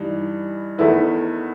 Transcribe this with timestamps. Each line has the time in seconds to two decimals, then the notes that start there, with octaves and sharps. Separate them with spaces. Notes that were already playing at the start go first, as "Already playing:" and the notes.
Already playing: G2 E3 D#4
0.78 E2 D#3 A3 E4 B4